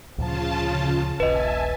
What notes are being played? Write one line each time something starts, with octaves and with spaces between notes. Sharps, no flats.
D2 A#2 C#3 F3 F4 A5
D#1 A#1 B4 D#5 E5 G#5 A5